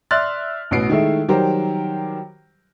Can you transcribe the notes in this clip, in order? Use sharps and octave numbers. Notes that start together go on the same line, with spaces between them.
D5 E5 C6 F6 F#6 A6
A1 B2 B3 C7 D7
D#3 G#3 A3 E4
D#3 F#3 G3 G4 A#4 C5